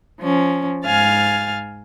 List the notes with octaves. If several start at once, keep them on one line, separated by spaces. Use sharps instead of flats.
F3 C#4
G#2 F5 G#5 F6 A6